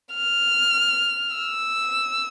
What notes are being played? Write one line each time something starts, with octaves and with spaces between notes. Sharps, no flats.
F6
E6